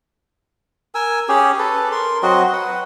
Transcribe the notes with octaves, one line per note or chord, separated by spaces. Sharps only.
A#4 G#5 E6
C#4 G4 G#4
A4 B4
A#4 C6
F#3 C4 F#4 D#5
B4 F#5